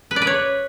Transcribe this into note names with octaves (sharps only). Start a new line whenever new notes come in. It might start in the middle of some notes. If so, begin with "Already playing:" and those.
B4
D5
B4
C#5